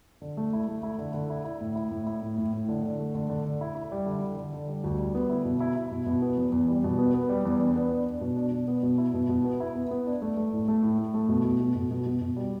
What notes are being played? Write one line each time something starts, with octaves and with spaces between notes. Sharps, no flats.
D3
A3
E4
A3
E4
D3
D3
E4
E4
A2
E4
A2
E4
A2
A2
A2
D3
D3
A3
D3
D3
D3
E4
E4
G3
D3
D3
D3
D3
G3
D2
G3
B3
E4
B2
E4
E4
B2
B2
B3
E2
E2
G3
B2
B3
B3
G3
E2
D4
B3
D4
D4
B2
D4
B2
B3
B2
E4
B2
B2
B3
E4
B3
B3
D4
A3
A3
A2
A3
A2
A2
A3
B2
B2
B2
B2
B2
B2
B2
G3